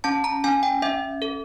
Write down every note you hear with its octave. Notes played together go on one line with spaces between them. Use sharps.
C#4 A5
A#5
C#4 G#5
G5
C#4 E5
A4